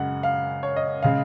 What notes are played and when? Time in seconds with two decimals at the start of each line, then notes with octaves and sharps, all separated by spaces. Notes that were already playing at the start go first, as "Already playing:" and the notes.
Already playing: F#2 C#3 G#3 F#5
0.23 F5
0.63 C#5
0.76 D#5
1.03 C#3 G#3 F5